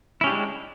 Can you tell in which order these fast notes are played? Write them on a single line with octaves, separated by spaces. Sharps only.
E4 C#4 G4 D4 G#3